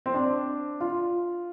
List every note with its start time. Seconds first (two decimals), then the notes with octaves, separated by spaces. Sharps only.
0.06 C4
0.14 D4
0.80 F4